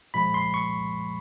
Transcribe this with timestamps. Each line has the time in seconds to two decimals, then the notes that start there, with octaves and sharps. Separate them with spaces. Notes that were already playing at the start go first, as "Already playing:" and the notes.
0.14 A#2 F3 G#3 B5
0.34 C6
0.54 C#6